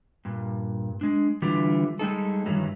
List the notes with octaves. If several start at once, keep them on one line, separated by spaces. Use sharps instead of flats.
G2 A#2
G#3 D4
D3 E3 G3 F4 G4
G3 G#3 D#4 A4
G2 D#3 E3 F#3 G3